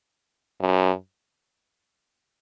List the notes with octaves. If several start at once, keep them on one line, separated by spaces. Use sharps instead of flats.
F#2